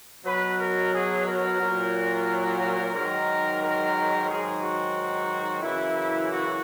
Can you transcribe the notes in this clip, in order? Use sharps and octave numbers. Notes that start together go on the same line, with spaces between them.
B2 F#3 B4
A#4
G#4
A#4
A#2 F#3
G#2 D#3 F#3 A#4
A#4
G#2 D#3 F#3 G#4
F#4
F#2 C#3 E3 E4
F#4